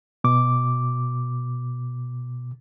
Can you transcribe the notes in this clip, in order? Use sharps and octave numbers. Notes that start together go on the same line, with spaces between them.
B2 D6